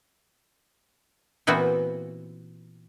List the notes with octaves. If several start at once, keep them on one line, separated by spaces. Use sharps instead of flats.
A#2 E3 B3 C4 F#4